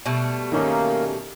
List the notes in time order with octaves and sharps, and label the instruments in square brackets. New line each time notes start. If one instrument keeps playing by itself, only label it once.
[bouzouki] B2 G3 A3
[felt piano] D#3 C#4 D#4 [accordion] A#3